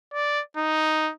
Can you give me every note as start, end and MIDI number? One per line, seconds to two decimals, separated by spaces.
0.13 0.41 74
0.57 1.12 63